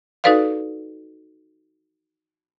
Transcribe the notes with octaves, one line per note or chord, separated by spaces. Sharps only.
D#4 F#4 A4 B4 D5 F5